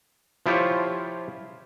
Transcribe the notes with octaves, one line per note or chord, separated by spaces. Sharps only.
F3 E4 F4 G4 C5 C#5